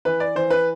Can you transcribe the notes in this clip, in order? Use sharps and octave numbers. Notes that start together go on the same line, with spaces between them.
E3 B4
D5
E3 C5
B4